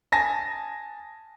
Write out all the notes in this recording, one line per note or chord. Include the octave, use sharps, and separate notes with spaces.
G#5 A5 A#6